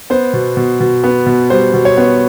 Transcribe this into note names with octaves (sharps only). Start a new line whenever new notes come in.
B3 C5
B2
B2
B2
B3
B2
G3 C5
B2
C#5
B3